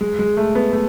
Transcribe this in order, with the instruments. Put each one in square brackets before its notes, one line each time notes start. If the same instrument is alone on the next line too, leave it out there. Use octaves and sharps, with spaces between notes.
[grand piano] G#3
G#3
A3
B3
A3